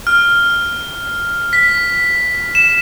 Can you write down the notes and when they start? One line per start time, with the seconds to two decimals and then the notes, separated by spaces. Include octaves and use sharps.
0.07 F6
1.53 B6
2.55 E7